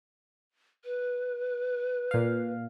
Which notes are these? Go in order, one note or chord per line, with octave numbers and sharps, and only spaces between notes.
B4
A#2 F5